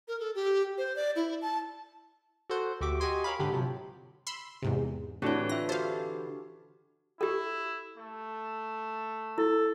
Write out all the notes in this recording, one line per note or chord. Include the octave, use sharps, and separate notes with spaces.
A#4
A4
G4
C5
D5
E4
A5
F#4 A4 C5 F#5
D2 F#4 G4 E5 D6
F#4 G4 D#5 G#5 C6
A#4 C#5 F5 B5
G#2 D3 G4 B5
C3 F3 F#3
B5 C6 E6
E2 G#2 C3
A2 D3 E3 C4 D4 F#4 G4 C#5
F4 E5 A#6
F#4 G4 A4 C5 F5
E4 G4 A4
A3
E4 A4